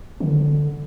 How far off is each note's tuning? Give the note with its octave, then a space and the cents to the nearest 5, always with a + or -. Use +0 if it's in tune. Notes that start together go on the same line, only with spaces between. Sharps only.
D3 +5